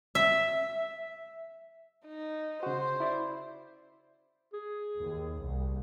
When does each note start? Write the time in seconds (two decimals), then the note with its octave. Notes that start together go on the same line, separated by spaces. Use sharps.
0.15 E5
2.06 D#4
2.63 C#3 F#4 C5
3.00 E4 D5 E5
4.53 G#4
4.99 D#2
5.43 C2